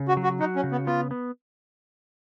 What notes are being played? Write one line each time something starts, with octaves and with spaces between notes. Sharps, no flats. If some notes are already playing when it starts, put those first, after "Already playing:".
Already playing: C#3
F#4
F#3
F#4
D#4 F#4
C#4
C#3
B3
B3 F4
B3